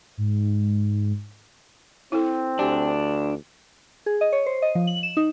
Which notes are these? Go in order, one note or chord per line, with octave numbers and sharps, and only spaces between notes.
G#2
C4 E4 A4
D2 D4 G4 G#5
G#4
D#5
C#5
C5
D#5
F3
F#7
E7
D#4